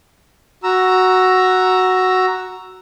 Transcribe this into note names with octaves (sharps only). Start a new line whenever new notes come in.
F#4 A#5 E6